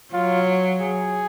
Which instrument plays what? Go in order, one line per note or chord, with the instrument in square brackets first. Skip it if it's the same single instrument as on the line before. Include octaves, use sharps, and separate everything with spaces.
[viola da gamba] F#3 [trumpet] F4
[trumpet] G#4